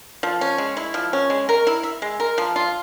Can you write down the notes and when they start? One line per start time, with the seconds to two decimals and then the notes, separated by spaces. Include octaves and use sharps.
0.23 F3
0.41 C#4
0.58 G#3
0.77 E4
0.94 F3
1.13 C#4
1.30 G#3
1.49 A#4
1.67 E4
1.83 E5
2.02 G#3
2.20 A#4
2.38 F3
2.56 F4